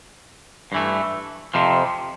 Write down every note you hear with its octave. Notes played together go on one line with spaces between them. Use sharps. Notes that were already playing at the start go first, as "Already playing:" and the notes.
G2 E3 A3
F2 C3 F3